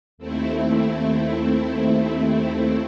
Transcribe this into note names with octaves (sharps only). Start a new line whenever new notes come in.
D#2 A3 C4 E4